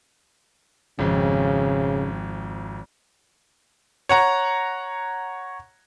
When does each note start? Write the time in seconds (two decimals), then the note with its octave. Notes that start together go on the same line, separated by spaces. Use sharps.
0.99 G#1 F2 C#3
4.09 C#5 F#5 A#5